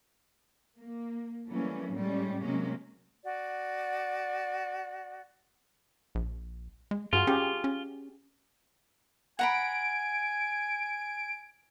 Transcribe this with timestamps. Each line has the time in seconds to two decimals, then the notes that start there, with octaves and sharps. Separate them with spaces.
0.80 A#3
1.49 E3 F#3 G3 A3 A#3 C#4
1.95 A2 G3 G#3 C#4
2.41 C3 F#3 G#3 A#3 C#4
3.23 F#4 D5
6.15 A#1
6.91 G#3
7.13 G2 F4 F#4 G#4
7.27 C#4 G4 G#4
7.64 C#4
9.39 F#5 G#5 A#5 B5 D7